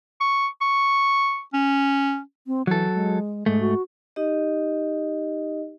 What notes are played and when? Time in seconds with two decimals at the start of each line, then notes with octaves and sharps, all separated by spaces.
0.20 C#6
0.61 C#6
1.53 C#4
2.47 C4
2.67 E3 F#3 A4
2.94 G#3
3.46 G#2 G#3 A3
3.61 F#4
4.16 D#4 G4 D#5